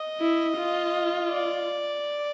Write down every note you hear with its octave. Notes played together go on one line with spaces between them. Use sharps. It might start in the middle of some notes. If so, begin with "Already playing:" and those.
Already playing: D#5
E4
F4
D5